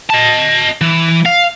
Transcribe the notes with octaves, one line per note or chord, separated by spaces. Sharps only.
D#5 A5
E3
F5